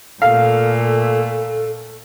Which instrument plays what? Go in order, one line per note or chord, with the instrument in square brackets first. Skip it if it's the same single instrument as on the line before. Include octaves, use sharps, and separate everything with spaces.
[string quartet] A#2 A3 [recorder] A4 [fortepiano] F5